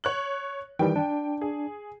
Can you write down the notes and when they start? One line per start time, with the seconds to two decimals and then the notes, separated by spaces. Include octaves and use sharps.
0.04 C#5 F#6 F#7
0.79 D#3 E3 G3 G5
0.96 D4
1.41 G#4